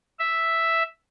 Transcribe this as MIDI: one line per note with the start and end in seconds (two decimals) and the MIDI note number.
0.19 0.83 76